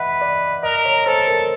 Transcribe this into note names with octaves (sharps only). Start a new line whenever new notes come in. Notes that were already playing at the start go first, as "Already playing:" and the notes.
Already playing: B4 D#5 E5 F#5
D5
A#4 D#5
C#5
A4 C5
A#4